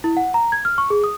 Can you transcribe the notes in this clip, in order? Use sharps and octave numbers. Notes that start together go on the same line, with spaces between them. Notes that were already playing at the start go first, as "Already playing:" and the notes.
E4
F#5
A#5
G#6
F6
C#6
G#4
D#6